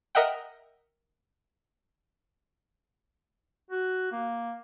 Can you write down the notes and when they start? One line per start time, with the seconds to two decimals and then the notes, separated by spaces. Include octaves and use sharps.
0.15 A#4 D#5 E5 F#5 G5
3.71 F#4
4.12 A#3